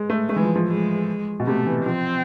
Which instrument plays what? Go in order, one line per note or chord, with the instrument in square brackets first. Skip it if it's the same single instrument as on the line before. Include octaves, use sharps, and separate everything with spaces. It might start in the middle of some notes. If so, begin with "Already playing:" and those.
Already playing: [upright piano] G#3
A3
[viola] G#3 [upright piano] A3
[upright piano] E3
F3
F3
[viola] G#3
[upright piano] B2
[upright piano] C3 [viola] A3
[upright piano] E3
[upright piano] F3 [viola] C4